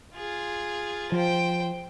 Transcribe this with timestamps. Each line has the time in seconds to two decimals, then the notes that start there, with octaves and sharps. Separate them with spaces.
0.15 F4 G#4
1.12 F3 C5 G5